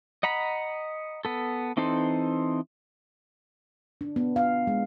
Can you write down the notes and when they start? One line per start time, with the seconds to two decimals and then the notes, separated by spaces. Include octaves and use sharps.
0.23 D#5 F#5 A#5 B5
1.25 B3 A4
1.77 E3 C4 D#4 A4 C5
4.01 D4
4.16 B3
4.36 F5
4.67 G#3